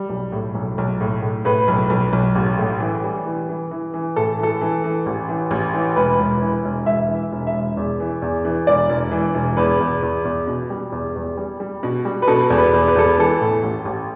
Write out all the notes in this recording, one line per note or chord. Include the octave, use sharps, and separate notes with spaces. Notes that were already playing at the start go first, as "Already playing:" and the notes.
Already playing: G3
B1
A2
B1
B1
A2
A2
A2 B4
B1
B1
B1
A1
A2
E3
G3
E3
E3
E3
E3
A2 A4
E3
A4
E3
E3
A1
E3
A1
E3
E1 B4
E1
E3
E1
E1 E5
E3
E1
E5
E1
E2
E3
E2
E3
E1 D5
E1
E3
E1
E2 B4
E2
E2
E2
B2
G3
E2
E2
G3
G3
B2
G3
B4
B2 A4
E2
B4
E2
B4
E2 A4
E3 A4
A2
A1
A1